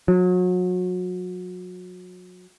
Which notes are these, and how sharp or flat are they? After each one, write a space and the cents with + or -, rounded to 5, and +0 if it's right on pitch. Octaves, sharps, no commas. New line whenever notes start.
F#3 -35